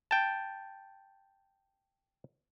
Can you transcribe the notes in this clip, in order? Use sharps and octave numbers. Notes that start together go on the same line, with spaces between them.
G5 A5